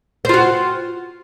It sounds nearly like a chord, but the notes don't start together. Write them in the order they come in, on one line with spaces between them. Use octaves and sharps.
C5 F4 F#4